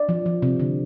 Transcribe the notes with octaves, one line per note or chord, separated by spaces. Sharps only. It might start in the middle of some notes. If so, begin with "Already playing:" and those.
Already playing: D5
F3
F3
C3
D3